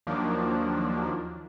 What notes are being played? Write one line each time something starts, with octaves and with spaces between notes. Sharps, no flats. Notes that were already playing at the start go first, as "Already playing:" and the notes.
D#2 D#3 F3 F#3 A#3 D4